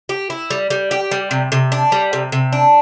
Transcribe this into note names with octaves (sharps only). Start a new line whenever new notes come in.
G4
E4
G3
G3
G4
G3
C3
C3
D4
G3
C3
C3
D4